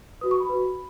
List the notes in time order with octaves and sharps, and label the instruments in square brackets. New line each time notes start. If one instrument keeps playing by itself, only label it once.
[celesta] F#4 B4 D#6
C#6
B5
F#4 B4